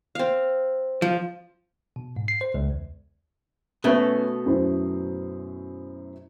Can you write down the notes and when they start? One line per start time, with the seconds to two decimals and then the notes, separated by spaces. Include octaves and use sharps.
0.15 C4 F5
1.02 F3
1.96 B2
2.16 G#2
2.28 C7
2.41 C5
2.54 C#2
2.70 E2
3.84 B2 A3 C#4 B4 E5
4.45 F#2 E4 C5